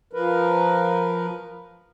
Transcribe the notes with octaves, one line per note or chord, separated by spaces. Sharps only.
F3 A#4 B4